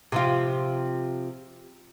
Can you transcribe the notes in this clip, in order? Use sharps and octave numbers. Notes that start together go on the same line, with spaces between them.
C3 F3 F4